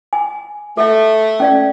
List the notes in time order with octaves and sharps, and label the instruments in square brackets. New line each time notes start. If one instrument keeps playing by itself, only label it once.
[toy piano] G#5
[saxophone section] A3 [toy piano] A4 E5
[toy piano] C#4 D5 F5